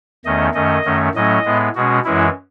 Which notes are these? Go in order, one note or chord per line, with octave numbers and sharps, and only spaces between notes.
E2 D#3 A3 C#4 D#5
F#2 D#3 A3 C#4 D#5
F#2 D#3 A3 C#4
A2 F#3 A3 C#4 D#5
A2 G#3 B3
B2 G#3 C#4 F#4
F#2 E3 G#3 C#4 E4